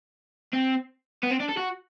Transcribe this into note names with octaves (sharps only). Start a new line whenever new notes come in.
C4
B3
C4
D4
A4
F#4